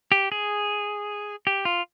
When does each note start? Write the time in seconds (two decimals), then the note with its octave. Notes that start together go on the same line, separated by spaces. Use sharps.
0.12 G4
0.32 G#4
1.47 G4
1.65 F4